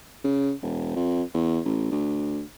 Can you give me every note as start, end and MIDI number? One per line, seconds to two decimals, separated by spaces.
0.24 0.52 49
0.63 0.95 28
0.96 1.23 41
1.34 1.60 40
1.65 1.89 33
1.91 2.42 38